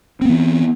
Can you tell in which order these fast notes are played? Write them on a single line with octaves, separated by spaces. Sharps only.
C4 B3 E3